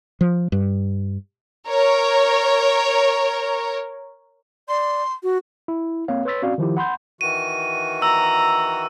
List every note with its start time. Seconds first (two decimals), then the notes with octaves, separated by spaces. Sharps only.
0.21 F3
0.52 G2
1.69 A#4 C#5
4.69 D5 C6
5.23 F#4
5.68 E4
6.08 A#3 C4 C#5 F5
6.25 B4 C#5 C6 E6 A6 B6
6.42 C4 C#4 F#4 D5 F5
6.58 D#3 F3 E4 G4
6.77 F#5 B5 C6 G6
7.21 D#3 E3 F#4 D#7
8.02 A#5 E6